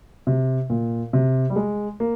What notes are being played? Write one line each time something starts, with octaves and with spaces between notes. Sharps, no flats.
C3
A#2
C3
G3
G#3
A#3